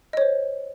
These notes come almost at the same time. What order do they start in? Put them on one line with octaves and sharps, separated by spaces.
D#5 C#5 C5